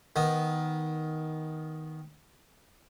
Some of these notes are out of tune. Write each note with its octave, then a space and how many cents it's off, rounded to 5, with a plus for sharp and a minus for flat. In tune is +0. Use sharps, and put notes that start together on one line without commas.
D#3 +10 B3 +0